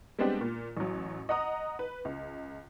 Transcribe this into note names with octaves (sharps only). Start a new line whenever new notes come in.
G3 G#3 B3 C4 D4 G4
A#2
A1 F#3
D#5 F#5 A#5 D#6
B4
C#2